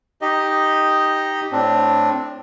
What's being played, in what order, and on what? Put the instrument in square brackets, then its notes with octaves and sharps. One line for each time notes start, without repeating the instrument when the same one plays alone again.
[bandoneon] D#4 G4 D#5
A2 C4 D4